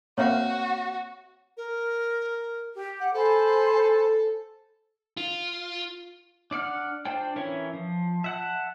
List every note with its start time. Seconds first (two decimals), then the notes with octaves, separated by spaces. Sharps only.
0.18 A#3 C4 F#4 C#5 E5 F5
1.57 A#4
2.75 G4
3.00 F#5
3.14 A4 C5 G#5 B5
5.17 F4
6.51 D4 D5 F#5 F6
7.05 D4 F4 C5 D5 G5
7.36 E3 C#4 A#4 C#5 E5
7.73 F3
8.24 E5 F#5 A5